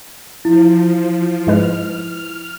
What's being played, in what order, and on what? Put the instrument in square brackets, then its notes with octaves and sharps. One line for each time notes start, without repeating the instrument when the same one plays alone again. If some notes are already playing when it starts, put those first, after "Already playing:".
[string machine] F3 [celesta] E4
[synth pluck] G#2 G#3 B4 [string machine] F6